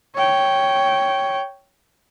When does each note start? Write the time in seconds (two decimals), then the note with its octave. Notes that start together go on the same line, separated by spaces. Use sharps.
0.16 C#5 G5